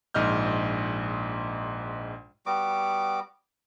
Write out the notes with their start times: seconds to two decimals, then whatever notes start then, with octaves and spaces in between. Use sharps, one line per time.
0.14 A#1 G#2 D#5 F6 G6
2.46 G3 B3 F#4 D6